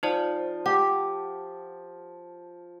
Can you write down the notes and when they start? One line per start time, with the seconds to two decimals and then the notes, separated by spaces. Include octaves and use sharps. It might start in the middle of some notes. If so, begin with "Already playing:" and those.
0.03 F3 D#4 C5 D5
0.66 G4 F#5